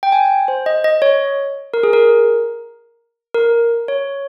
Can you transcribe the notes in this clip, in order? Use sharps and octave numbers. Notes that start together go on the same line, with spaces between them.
G5
G#5
C5
D#5
D#5
C#5
A#4
G#4
A#4
A#4
C#5